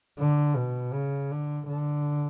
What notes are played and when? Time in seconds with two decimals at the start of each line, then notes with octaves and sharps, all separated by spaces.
0.20 D3
0.57 B2
0.93 C#3
1.32 D3
1.68 D3